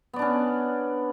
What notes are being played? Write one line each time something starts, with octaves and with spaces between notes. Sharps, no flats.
B3 C#4 D4 D5